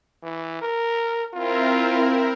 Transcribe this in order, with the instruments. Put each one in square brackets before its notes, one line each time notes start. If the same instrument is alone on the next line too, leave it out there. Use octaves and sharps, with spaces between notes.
[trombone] E3
A#4
[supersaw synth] C4 E4 A#4 [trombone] F4